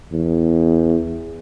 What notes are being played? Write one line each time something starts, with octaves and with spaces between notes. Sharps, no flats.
E2